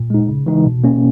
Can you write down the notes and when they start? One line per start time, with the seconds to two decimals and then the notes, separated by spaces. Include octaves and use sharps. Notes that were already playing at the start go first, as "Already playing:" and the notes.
Already playing: A#2
0.10 G#3 D#4
0.29 C#3
0.46 E3 G#3 D#4
0.65 B2
0.84 A#3 C#4